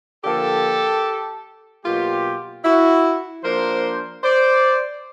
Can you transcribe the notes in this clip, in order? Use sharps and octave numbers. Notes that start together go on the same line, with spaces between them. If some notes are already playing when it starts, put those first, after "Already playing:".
D3 F3 A#3 G4 A4
B2 F#3 A#3 F4 G4
E4 F#4
F3 A#3 D4 A#4 C5
C5 D5